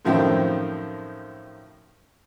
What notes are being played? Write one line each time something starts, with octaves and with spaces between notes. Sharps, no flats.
F#2 A2 D#3 F3 C4 G5